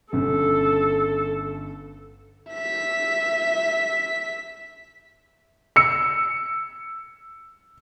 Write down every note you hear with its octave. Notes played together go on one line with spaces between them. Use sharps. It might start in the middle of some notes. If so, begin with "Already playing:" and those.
G1 C#3 A4
E5 B6
E6 C#7